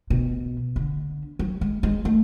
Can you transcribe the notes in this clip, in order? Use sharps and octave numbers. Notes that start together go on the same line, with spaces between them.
B2
D3
F#3
G#3
G#3
A3